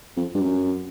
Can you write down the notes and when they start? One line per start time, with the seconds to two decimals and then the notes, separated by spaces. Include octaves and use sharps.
0.17 F2
0.35 G2
0.41 F#2